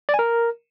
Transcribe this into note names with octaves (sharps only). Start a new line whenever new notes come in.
D5
G#5
A#4